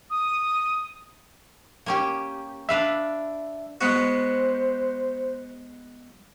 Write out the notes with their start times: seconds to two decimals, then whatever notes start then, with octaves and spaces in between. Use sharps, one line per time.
0.10 D#6
1.86 A#3 C#4 G4
2.69 D4 B4 E5 F5
3.81 G#3 B3 F#4 C5